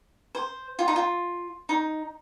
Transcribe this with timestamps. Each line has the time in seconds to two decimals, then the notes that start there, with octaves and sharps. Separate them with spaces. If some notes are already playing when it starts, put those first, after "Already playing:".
0.35 C5
0.79 F4
0.88 D#4
0.96 F4
1.69 D#4